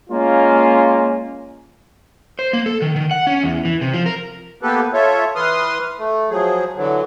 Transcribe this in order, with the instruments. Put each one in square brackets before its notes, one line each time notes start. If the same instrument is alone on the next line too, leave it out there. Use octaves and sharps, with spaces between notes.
[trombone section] G#3 A#3 C#4 F4
[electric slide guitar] C5
A#3
A4
D#3
D#3
F#5
C#4
E2
E3
C3
F3
A#4
[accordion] A#3 B3 G4 A4 B4
F4 A4 C#5 E5
E3 B4 C6 D#6 F6
A3
F3 F#3 G#4
D3 E3 F#3